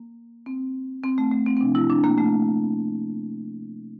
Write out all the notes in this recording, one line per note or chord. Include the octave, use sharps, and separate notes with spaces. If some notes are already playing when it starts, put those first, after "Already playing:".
Already playing: A#3
C4
C4
A3
A3
C4
C4
C3 F3 D4
E4
D4
A#3
A3